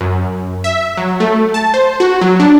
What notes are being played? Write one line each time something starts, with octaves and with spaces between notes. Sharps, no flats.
F#2
E5
F#3
A3
A5
C5
F#4
F#3
D4